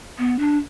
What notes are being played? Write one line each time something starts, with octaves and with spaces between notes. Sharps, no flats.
B3
D4